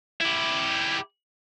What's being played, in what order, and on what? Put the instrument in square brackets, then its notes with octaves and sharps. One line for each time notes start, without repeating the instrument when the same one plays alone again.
[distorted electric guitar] E4 G4